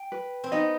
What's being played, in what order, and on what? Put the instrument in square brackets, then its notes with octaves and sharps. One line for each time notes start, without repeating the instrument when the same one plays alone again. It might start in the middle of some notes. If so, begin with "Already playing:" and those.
Already playing: [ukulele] G5
B4
[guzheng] C4
[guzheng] B3 D#4 [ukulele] D#5